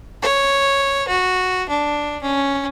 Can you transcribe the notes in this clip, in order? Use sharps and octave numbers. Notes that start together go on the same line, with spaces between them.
C#5
F#4
D4
C#4